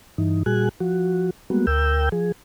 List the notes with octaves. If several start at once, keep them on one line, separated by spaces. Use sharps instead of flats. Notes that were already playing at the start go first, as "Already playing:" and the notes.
G2 E3 D#4
A#2 G3 F#4 G#4 G#5 F#6
F3 F#4
G3 G#3 A#3 B3 F#4
D2 A#4 G5 E6 G6
F3 G#4